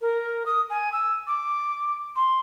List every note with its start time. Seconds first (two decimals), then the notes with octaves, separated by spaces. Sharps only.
0.02 A#4
0.46 D#6
0.70 G#5
0.92 E6
1.27 D6
2.16 C6